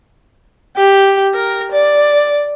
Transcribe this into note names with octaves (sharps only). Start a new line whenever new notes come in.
G4
A#4
D5